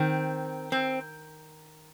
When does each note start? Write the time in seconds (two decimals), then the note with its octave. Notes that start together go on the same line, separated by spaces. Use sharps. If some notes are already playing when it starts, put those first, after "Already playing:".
Already playing: D#3 C4
0.72 C4